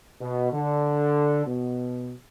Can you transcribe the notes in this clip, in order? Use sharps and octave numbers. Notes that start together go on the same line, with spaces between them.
B2
D3
B2